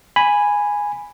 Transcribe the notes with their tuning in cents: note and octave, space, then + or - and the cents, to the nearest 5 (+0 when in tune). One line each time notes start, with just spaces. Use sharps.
G#5 -5 B5 +0